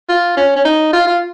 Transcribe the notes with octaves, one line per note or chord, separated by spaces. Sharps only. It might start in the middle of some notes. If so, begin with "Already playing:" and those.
F4
C#4
C#4
D#4
F4
F4